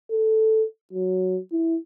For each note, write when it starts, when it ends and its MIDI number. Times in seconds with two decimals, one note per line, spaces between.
0.11 0.64 69
0.93 1.39 54
1.52 1.76 64